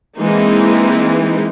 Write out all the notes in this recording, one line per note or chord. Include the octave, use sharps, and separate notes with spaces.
E3 G#3 A#3 C4 D#4